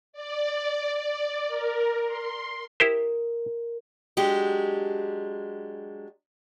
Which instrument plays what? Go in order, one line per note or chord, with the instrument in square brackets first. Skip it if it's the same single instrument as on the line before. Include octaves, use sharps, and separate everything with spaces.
[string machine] D5
D5
A#4
C6
[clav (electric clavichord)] E4 G4 C5 [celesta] A#4
[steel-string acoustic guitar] F#3 G#3 D4 G4